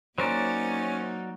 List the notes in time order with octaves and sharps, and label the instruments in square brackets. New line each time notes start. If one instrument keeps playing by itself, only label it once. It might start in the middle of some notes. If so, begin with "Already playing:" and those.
[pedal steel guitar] F#3 A#4 D5 [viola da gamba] A#3 D#4 [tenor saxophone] C#4 [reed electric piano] C5